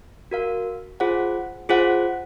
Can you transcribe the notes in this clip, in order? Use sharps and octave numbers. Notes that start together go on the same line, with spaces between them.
F#4 A#4 F5
F4 G#4 C5 F#5
F4 G#4 C5 F#5